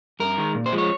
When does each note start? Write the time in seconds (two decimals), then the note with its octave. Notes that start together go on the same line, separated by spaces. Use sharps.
0.20 G2 A#4
0.38 D#3 G#3
0.55 A#2
0.66 C5
0.72 F3 G#3
0.78 C#5